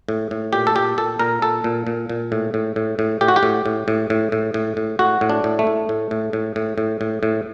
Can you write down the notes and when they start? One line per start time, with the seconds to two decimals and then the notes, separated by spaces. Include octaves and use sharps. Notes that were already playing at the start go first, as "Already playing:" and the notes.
0.09 A2
0.31 A2
0.53 A#2 G4
0.67 A4
0.75 A#2 G4
0.98 A#2 A4
1.19 A#2 A#4
1.42 A#2 A4
1.64 A#2
1.87 A#2
2.09 A#2
2.32 A2
2.54 A2
2.76 A2
2.99 A2
3.21 A2 G4
3.28 F#4
3.36 G4
3.43 A2
3.66 A2
3.88 A2
4.10 A2
4.32 A2
4.54 A2
4.77 A2
4.99 A2 F#4
5.21 A2
5.29 D4
5.44 A2
5.59 A3
5.67 A2
5.89 A2
6.11 A2
6.33 A2
6.56 A2
6.78 A2
7.01 A2
7.23 A2